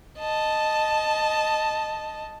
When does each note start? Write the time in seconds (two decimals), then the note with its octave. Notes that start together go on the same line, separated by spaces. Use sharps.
0.19 D#5 A5